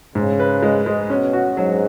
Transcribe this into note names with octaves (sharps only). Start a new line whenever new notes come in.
G#2 C#3
B4
G#3
G#3
B2 C#4
F#4
G#2 F#3